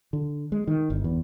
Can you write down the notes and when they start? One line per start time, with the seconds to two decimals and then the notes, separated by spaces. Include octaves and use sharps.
0.13 D3
0.52 G#3
0.67 D#3
0.90 G1
1.04 E2